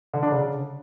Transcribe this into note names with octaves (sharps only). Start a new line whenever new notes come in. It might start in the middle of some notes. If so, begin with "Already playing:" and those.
D3
D4
C#3